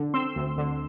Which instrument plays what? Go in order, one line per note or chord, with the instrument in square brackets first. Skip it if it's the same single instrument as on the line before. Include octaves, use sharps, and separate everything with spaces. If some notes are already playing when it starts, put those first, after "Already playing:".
Already playing: [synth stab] D3
C4 C6 E6
D2
D3